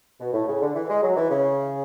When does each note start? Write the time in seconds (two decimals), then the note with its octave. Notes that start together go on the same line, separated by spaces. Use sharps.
0.20 B2
0.34 A2
0.48 C#3
0.62 D3
0.76 E3
0.89 G#3
1.03 F#3
1.17 E3
1.30 C#3